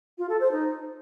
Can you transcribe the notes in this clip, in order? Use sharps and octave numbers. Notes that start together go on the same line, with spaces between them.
F4
A4
C5
D#4